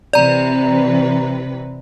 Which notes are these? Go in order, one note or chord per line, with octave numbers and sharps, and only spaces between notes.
C3 E3 B4 D5 A#5